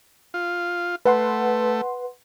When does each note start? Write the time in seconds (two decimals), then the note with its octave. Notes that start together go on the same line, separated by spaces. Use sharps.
0.34 F4
1.05 A3 B4 F#5 C6